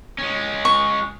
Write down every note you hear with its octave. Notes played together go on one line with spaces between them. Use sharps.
G#3 C#4
C#6